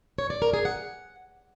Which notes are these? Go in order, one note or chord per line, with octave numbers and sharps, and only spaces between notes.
C#5
D5
A#4
G#4
F#5